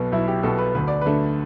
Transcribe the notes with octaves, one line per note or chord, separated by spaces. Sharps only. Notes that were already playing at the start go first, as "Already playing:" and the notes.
Already playing: B1 B2 B3 A4
B1 E4
G4
B2 B3 A4
B4
D2 B4
D5
D3 A3 B4